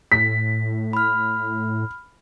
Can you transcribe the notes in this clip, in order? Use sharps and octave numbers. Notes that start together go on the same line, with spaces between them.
A2 B6
B5 F6